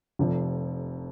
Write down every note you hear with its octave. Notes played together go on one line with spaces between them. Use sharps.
F1 F2 C3